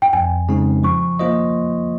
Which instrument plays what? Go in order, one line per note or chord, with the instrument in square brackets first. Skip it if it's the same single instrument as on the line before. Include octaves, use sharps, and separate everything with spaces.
[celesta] G5
[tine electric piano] F2 [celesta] G#5
[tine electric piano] C#3 G#3 C4 D#4
[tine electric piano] F3 [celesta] C#6
[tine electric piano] A#3 F4 C5 D#5